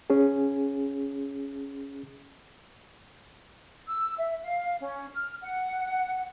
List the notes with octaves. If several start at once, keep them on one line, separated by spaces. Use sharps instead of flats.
C#4 G#4
E6
E5
F5
C#4
F6
F#5